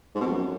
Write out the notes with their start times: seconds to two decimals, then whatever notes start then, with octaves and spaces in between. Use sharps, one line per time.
0.15 G#2
0.21 B2
0.26 F2
0.32 F#2